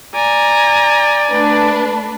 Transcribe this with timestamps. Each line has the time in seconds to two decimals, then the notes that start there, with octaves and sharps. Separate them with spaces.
0.15 D5 G#5 A#5
1.31 A3 D4 B4